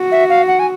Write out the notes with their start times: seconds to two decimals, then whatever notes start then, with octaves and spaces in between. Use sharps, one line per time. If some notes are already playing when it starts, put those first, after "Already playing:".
Already playing: F#4
0.11 E5
0.29 F5
0.47 F#5
0.59 G#5